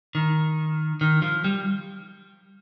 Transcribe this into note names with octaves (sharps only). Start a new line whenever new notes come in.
D#3
D#3
F3
G3